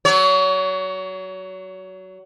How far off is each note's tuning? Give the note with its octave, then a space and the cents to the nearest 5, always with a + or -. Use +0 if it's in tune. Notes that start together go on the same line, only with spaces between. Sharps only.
F#3 +15 C#5 +35